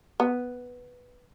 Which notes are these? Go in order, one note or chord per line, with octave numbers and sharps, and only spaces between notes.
B3